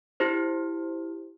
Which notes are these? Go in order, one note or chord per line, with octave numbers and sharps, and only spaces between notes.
E4 G4 C5